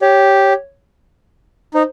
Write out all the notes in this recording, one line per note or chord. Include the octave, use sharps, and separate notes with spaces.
G4 C#5
D#4 C5